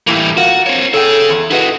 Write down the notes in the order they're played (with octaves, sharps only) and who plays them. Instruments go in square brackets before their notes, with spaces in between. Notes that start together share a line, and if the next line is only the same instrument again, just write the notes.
[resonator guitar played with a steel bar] A2 A#3 [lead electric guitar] E3 G3
[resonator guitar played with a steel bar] F4 A#4 [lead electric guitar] F#4
[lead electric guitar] C4 C#5
[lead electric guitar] G#4 C#5 [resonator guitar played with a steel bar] A4 G5
[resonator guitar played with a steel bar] E2
[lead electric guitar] E4 F#4 [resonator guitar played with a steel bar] G#4 B4 D#5